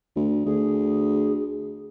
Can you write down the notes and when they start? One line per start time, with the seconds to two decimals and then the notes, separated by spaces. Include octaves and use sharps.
0.16 D2
0.45 D2 G#4